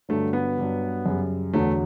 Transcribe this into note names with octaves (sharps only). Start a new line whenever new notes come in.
G2 D3 F#3 A3
B3
G2 F#3
F#2 C#3 G3
E2 D3 F#3 A3